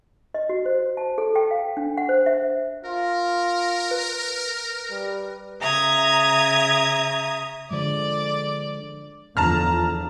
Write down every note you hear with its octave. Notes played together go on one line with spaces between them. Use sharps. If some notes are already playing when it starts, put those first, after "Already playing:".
D#5
F#4
C5
A5
A4
G5
F5
D4
F#5
C5
E5
F4 A#4
B4
G3
C#3 E5 A#5 D#6 G#6
D3 F3 G#3 D5
E2 D3 F3 A5 A#5 F6